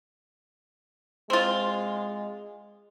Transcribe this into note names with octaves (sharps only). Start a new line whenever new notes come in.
G#3 C4 F4